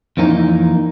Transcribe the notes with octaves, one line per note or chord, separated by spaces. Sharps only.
F2 E3 A#3 C#4 D#4